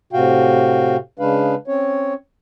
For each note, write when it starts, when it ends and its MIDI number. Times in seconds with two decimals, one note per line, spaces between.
0.13 0.97 45
0.13 0.97 48
0.13 0.97 66
0.13 0.97 77
0.13 0.97 79
1.19 1.55 49
1.19 1.55 56
1.19 1.55 62
1.19 1.55 71
1.19 1.55 77
1.68 2.14 60
1.68 2.14 61
1.68 2.14 73